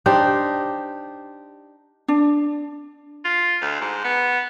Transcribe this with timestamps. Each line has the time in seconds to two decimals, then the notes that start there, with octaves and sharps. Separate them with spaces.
0.06 D4 D#4 G4 C5
2.08 D4
3.25 F4
3.61 D2
3.81 G#2
4.04 B3